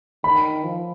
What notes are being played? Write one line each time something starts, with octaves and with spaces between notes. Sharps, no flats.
D#3 B5
F3